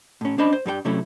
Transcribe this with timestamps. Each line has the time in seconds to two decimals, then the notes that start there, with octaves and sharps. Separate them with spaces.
0.21 A2 C#4
0.38 C#4 D4 C5 D#5 A5 B5
0.53 C5
0.66 G2 G3 A4 G5
0.85 C3 F#3 A3 C#4 E4